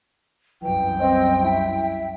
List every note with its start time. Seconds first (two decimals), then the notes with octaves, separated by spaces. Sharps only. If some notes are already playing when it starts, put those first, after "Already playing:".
0.62 C2 F#2 E3 G5
1.00 C4 D#5
1.44 E4 E5